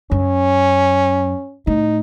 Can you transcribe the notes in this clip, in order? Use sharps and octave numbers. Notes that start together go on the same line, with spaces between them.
F#2 C#4
A2 D#4